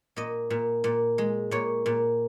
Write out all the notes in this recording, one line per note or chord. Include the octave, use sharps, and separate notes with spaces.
A#2 D#5
A#2
A#2
G#3
A#2 C#5
A#2